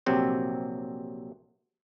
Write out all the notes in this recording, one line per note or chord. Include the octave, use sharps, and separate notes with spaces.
A#1 C3 F#3 C4 G4